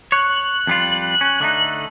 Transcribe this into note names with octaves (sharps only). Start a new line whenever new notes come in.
C#5 F#6
F2 G3 F4
C#4
D3 A3 D#4